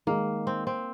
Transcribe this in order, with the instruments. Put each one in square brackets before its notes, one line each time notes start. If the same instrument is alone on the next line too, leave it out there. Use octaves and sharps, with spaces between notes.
[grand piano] D#3 G#3 D#4 [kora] A#3
[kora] C4
C4